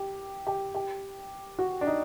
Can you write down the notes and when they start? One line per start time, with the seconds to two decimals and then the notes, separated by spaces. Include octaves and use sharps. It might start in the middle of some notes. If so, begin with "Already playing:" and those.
Already playing: G4
0.47 G4
0.75 G4
1.59 F#4
1.81 D4
1.87 D#4